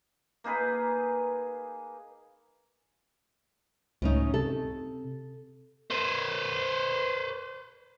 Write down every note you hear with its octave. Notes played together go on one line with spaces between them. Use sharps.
A#3 D#4 G#4 B4
C#2 A2 C#4 D#4
C3 A4
B4 C5